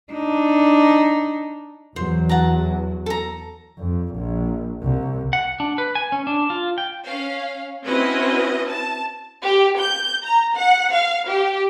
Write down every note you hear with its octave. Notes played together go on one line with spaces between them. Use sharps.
D4 D#4
E2 F#3 C5
F#5 A5 A#5
A4 A#5
F2
A#1
C2
F#5
D4
B4
G#5
C#4
D4
F4
G5
C#4 F5
C4 C#4 E4 F#4 B4 D#5
A5
G4
G6
A#5
F#5
F5
G4